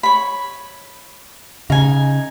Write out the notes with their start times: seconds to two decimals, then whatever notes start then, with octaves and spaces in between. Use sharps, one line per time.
0.03 C#5 B5
1.70 C#3 D#4 G#5